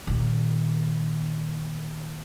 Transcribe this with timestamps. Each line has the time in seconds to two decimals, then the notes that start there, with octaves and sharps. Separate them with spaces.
0.07 A#2 D#3